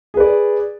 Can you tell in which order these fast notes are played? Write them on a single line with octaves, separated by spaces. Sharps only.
G#4 B4 D5